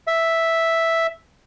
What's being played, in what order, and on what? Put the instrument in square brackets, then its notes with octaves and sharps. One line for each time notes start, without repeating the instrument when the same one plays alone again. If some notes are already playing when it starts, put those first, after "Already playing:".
[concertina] E5